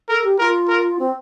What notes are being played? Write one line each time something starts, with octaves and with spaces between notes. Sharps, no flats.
A4 A#4
G4
F4 A#4
A#4
C4